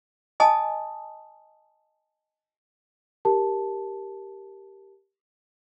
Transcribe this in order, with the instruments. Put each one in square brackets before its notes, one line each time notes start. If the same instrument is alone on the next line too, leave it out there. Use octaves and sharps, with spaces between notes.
[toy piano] D#5 G#5 A5 D#6
[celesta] G4 A#4 A5